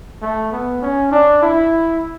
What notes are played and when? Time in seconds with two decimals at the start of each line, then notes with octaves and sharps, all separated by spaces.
0.22 A3
0.52 B3
0.82 C#4
1.12 D4
1.42 E4